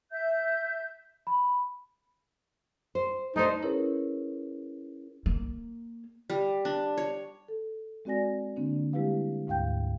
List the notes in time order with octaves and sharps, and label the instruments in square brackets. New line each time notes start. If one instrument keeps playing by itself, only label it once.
[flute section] E5 G6
[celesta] B5
[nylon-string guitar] C5
[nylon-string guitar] A3 D4 C5 [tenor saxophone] D#4
[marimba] C#4 E4 G#4 A#4 B4 C#5
[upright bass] A#3
[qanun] G3
D4
C#5
[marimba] A4
G#3 C4 F#4 D5 G#5 A#6
D3 A#3 C4 D4
G3 G#3 E4 G4 B4 F5
D2 G#2 F5 G5 G6